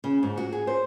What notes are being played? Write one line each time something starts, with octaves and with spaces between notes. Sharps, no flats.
C#3
G#2
F#4
G#4
C5